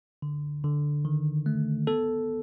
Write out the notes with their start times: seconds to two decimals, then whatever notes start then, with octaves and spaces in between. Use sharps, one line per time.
0.22 D3
0.64 D3
1.05 D#3
1.46 A3
1.87 B3 A4